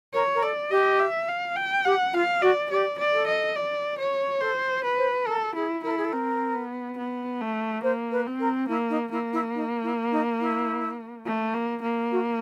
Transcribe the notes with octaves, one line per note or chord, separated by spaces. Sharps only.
A#4 C#5
A#4
A4 D5
G4 D#5
E5
F5
G5
G4 F#5
F4 F5
F#4 D5
G4 D5
D5
A4
D#5
D5
C#5
A4 C5
B4
C5
A4 A#4
E4 G#4
E4 A#4
A4
G#4
A4
C4 A#4
B3
B3
A3
A#3 C5
B4
C4
A#4
A#3 E4
D#4
A#3 E4
E4
D#4
E4
D#4
E4
A3
A#3
A#3
F#4